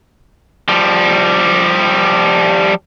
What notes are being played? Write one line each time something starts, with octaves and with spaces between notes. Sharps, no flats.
F3 G3